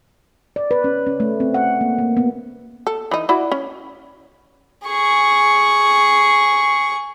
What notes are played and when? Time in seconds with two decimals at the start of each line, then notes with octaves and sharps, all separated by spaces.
0.56 D5
0.71 B4
0.84 C#4
1.06 C#4
1.20 A3
1.40 C4
1.54 F#5
1.81 A#3
1.99 A#3
2.17 B3
2.87 A4
3.11 E3 D#4
3.29 E4 F#4 D5
3.52 C#4
4.88 G#4 C#6